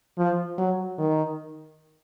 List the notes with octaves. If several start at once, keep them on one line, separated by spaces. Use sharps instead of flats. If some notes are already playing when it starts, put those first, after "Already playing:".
F3
F#3
D#3